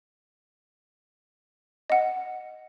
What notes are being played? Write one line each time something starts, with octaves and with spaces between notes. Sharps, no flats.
D#5 F#5